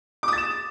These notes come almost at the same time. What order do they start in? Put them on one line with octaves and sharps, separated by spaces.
D6 D#6 A6 E7